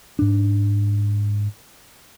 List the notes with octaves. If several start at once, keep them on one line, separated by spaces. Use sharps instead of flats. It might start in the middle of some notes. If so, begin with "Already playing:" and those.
G#2 D4